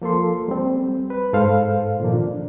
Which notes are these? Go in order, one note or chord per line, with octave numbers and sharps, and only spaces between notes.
F3 A#3 A4 C6
G3 C4
B4
G#2 A4 C5 F5
A#2 D#3 F3 A#3
D4